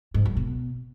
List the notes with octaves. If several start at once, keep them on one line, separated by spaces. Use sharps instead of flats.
G#2
F#2
B2